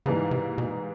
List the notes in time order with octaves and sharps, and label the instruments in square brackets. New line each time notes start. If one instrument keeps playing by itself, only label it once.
[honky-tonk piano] G#2 E3 G3 A#3 D#4 [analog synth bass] C#3
[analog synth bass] C3
B2